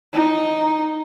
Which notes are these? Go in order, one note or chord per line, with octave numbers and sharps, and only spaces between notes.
D#4